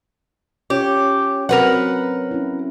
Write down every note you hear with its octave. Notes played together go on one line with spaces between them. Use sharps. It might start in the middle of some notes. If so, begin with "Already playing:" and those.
C#4 F4 G4 C#5
F#3 C4 A#4 B4 F#5
C#4 E4